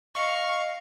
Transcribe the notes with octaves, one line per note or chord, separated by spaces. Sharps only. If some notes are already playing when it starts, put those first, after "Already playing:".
D#5 F5 C#6 C#7